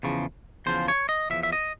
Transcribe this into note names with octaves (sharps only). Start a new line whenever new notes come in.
E2 C#3 F3
E2 C#3 F3 C5
C#5
D#5
E2 C#3 F3 E5
E5
D#5